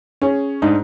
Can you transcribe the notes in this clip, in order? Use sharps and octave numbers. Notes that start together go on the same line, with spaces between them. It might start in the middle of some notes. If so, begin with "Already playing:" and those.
C#4 G#4 C#5
G#2 D4 D#4